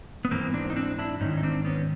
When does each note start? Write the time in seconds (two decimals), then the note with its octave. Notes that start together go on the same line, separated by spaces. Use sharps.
0.25 B3
0.31 G#2 E3 A#3 C4
0.54 C4 D4
0.70 D#4
0.76 C4 D4
0.99 D4 E4
1.21 G#2 D#3 C#4 D#4
1.37 D#4
1.43 C4 D4
1.65 B3 C#4